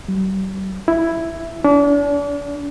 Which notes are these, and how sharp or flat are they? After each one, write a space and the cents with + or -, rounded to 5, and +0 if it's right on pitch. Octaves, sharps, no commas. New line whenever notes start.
G3 -40
E4 +5
D4 -40